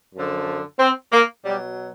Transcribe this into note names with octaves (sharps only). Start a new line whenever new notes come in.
F#2 D3 F3
C4
A#3
B2 F#3 G3